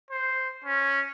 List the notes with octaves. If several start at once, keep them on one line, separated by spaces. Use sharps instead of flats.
C5
C#4